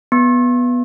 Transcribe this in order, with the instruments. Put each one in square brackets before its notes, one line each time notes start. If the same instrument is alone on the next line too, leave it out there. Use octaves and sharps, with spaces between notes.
[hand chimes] B3